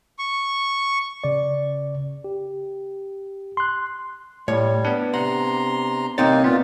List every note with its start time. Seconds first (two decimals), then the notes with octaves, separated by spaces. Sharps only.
0.19 C#6
1.24 C#3 D5
2.24 G4
3.57 C6 F#6
4.48 A2 G3 C#5
4.85 B3 D4
5.14 C3 F#5 A#5 C6
6.18 C2 A#3 C4 D#4 C#5 A6
6.44 A#2 B3 F4